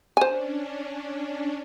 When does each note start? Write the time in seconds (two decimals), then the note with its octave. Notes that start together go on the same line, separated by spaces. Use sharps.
0.17 C#4 D4 C5 G#5